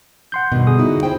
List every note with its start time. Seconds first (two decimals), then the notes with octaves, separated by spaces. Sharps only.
0.32 F#5 C6 G6
0.52 G2 B2 D#3
0.67 D3 G#4 D#6
0.79 D#4 E4 F#4
1.03 E4 C5 G5